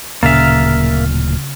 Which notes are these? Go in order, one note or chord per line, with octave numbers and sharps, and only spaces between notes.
D1 A#2 C#3 A#3 E5 F6 A6